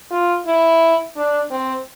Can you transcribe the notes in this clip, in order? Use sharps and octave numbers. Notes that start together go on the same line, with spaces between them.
F4
E4
D4
C4